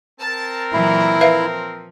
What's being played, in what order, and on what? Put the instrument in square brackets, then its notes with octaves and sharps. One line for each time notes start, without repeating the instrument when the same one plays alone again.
[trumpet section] C4 A#4 [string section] A5
[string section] A#2 E3 F#3 [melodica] E4
[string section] F3 [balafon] B4 E5 F5